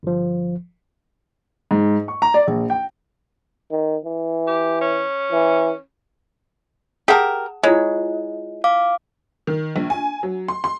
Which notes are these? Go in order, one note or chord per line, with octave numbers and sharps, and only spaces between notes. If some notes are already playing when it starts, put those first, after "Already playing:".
G1 F3
G#2
C#6
A#5
D5
A#1
G5
D#3
E3
G4
C#4
E3
G4 G#4 A#4 F#5 A5
G#3 E4 F4 C#5 F#5
F5 D6
D#3
A#1
G#5
F#3
C6
C6